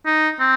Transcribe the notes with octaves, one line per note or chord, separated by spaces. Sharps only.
D#4
C4